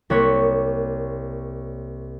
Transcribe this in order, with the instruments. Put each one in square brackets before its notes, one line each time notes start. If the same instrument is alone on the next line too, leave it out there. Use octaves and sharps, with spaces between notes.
[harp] C2 A#3 C#5 F#6 G#6 B6